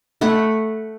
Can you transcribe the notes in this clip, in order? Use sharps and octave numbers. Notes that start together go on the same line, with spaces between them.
A3 F#5 B5